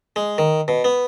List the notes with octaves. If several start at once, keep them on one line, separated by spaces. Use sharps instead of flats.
G#3
D#3
B2
B3